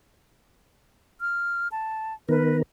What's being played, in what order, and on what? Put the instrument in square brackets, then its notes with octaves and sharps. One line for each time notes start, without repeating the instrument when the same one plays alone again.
[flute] F6
A5
[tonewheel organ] D#3 B3 A#4 [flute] B4